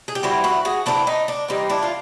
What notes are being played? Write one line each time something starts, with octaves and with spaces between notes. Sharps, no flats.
G#4
G4
E3 G3 C4 E4 F#4
E4 F#4
F#4 G#4
E3 G3 C4 D4 E4
D#4
D4
E3 G3 C4 D#4
D4 E4
F4